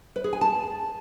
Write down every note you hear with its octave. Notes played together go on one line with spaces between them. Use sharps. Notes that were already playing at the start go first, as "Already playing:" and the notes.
B4
G#4
G#5
A5